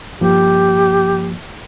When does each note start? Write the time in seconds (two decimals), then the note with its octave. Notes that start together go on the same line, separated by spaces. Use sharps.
0.21 G2 F3 A#3 G4